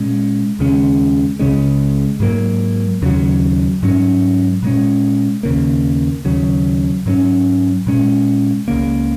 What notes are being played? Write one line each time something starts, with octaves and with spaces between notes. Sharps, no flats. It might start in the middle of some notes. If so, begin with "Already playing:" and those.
Already playing: A#2 G#3 C#4
D#2 C#3 G#3 C#4
C#2 C#3 G#3 C#4
G#2 F#3 A#3
D#2 C#3 F#3
G#2 F#3 C#4
A#2 G#3 C#4
D#2 C#3 A#3
D#2 C#3 F#3
G#2 F#3 A#3 C#4
A#2 G#3 C#4
C#2 C#3 A#3